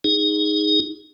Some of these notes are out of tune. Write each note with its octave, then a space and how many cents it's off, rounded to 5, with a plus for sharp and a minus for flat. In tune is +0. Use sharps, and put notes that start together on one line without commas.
D#4 +0 G#4 -5